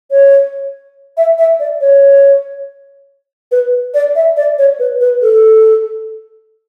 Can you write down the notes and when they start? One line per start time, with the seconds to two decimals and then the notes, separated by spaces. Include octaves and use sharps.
0.11 C#5
1.17 E5
1.38 E5
1.60 D5
1.81 C#5
3.52 B4
3.94 D5
4.15 E5
4.37 D5
4.59 C#5
4.80 B4
5.01 B4
5.22 A4